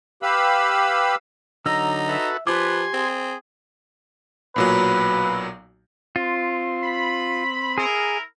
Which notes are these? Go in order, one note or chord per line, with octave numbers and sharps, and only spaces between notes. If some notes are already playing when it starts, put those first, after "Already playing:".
G4 B4 F5 B5 E6
D3 F#3 D#4 A#5 E6
F#4 A4 B4 E5
F3 G4 B4 G#5 C6 D6
C4 G#4
B1 A#2 F#3 B4
C4 F4
B5
E4 G#4 A#4